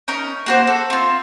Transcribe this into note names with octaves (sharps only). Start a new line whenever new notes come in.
C#4 D#4 A#4
A#3 F#4 C5
A4
C4 F4